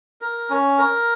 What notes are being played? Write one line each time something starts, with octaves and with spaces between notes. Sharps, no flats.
A#4
C#4
A#4